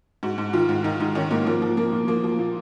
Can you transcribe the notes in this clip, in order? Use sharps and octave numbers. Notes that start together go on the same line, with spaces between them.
G#2 F#4
G#2
D#3 F4
G#2
D#3 D#4
G#2 D#4
D#3 C#4
G#2 A#3
F3 A#3
F3
F3 A#3
A#2
F3 A#3
F3
A#2